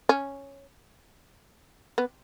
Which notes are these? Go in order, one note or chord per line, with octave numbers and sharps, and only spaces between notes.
C#4
B3